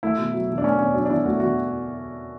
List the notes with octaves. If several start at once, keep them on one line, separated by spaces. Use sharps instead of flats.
A3 E4
B2
F#3
B2
D4
A3 C#4
B2 C#4
F#3 D4
D4
B2 E4
A3 F#4
B2 F#4